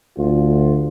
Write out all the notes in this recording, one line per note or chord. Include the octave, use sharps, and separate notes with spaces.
D2 F4